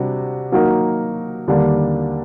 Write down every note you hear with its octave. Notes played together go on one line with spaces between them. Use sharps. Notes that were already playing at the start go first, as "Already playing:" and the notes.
Already playing: C3 G3 D4 F#4
F#3 A#3 D#4 F#4 A#4
D#2 D3 G3 A#3 D4